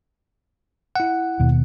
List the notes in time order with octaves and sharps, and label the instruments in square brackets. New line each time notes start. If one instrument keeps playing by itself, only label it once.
[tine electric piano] E4 F#5
[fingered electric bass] D#2 B2